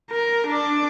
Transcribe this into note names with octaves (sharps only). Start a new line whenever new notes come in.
A#4
D4 D5